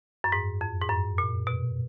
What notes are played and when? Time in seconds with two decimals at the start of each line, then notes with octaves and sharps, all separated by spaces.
0.24 F#2
0.32 G#2
0.61 F2
0.82 G#2
0.89 F#2
1.18 A#2
1.47 B2